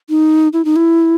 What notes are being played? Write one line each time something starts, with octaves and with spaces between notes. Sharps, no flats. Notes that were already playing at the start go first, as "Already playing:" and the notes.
D#4
E4
D#4
E4